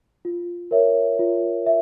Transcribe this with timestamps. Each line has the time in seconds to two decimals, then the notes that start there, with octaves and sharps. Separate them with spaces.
0.25 F4
0.71 A#4 C#5 E5
1.19 F4
1.66 E5